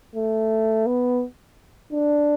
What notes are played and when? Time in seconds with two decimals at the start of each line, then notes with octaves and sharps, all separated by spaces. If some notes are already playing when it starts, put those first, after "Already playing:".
0.15 A3
0.86 B3
1.93 D4